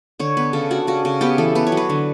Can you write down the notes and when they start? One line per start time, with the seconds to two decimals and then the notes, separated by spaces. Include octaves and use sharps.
0.19 D3 C#5
0.37 B3 B4
0.53 C#3 A4
0.70 D4 F#4
0.87 C#3 F#4
1.05 C#3
1.21 B3 G4
1.38 E3 A4
1.55 B3 B4
1.67 C#5
1.72 F#3
1.77 B4
1.90 D3